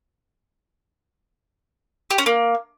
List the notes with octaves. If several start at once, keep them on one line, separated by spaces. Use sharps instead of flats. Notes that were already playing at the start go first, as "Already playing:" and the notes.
G4
C#4
A#3